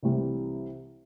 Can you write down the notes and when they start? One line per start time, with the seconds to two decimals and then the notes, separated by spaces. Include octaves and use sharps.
0.02 C2 C3 E3 G3